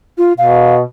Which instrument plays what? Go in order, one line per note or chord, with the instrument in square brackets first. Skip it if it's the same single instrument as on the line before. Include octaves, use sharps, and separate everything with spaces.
[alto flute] F4
[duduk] B2 [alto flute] F5